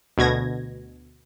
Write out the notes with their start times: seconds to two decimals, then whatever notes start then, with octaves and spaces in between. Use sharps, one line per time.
0.18 D2 B2 G#6 A#6